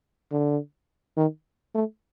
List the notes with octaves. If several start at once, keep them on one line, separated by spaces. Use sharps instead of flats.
D3
D#3
A3